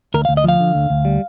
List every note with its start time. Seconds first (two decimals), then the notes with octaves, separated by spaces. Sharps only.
0.14 D2 A#4
0.25 D2 F5
0.37 D#5
0.44 F3 F5
0.60 D3
0.75 D2
0.90 D2
1.05 G3